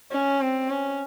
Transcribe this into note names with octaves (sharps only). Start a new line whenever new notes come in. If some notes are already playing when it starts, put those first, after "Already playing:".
C#4
C4
C#4